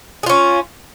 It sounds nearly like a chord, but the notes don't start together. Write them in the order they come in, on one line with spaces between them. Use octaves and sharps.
G#4 F4 C#4